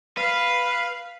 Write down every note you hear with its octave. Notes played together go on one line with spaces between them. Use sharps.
B4 F5